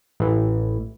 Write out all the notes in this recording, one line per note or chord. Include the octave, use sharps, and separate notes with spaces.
A1 E3